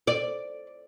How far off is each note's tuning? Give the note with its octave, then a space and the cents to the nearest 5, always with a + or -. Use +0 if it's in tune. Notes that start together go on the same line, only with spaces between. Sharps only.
D5 +0